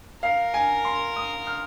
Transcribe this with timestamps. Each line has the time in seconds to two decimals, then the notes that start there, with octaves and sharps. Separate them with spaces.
0.22 A#4 F5
0.54 G#5
0.85 C6
1.16 D#6
1.47 F6